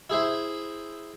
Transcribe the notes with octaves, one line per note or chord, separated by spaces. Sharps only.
E4 G#4 C5 E5